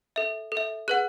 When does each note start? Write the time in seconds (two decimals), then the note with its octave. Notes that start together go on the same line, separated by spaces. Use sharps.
0.16 A4 E5
0.52 A4
0.57 E5
0.88 G#4 B4 F#5 F#6